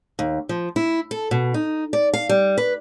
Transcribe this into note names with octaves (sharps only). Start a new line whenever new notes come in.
D#2
F3
E4
A4
B2
D#4
D5
F5
G3
B4